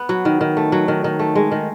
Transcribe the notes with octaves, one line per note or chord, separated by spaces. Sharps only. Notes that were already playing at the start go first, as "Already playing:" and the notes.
Already playing: B3
F#3
D#3
D#3
A3
F#3
D#3
D#3
A3
G#3
D#3